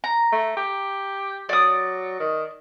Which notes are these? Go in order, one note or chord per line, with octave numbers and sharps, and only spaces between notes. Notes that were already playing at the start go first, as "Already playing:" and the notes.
A#5
A3
G4
F#3 D5 D#6
D#3